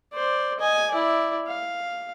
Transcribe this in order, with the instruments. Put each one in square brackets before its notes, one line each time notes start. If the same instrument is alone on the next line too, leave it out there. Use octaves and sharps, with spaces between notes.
[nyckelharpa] C5 D5
D#5 G#5
E4 D5
F5